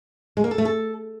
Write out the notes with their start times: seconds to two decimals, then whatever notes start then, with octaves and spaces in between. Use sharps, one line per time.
0.37 G#3
0.44 A#3
0.51 A4
0.58 A3
0.65 A4